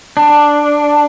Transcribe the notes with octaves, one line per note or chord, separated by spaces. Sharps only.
D4